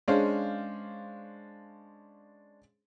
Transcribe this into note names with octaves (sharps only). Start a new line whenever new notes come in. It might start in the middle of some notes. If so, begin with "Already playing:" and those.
G#3 C#4 D4 C5 F5